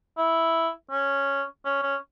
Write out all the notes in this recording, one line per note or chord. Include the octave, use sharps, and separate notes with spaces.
E4
C#4
C#4
C#4